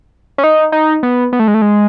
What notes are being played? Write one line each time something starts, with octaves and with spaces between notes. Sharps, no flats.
C#4
D#4
D#4
B3
B3
A3
G#3
A3
G#3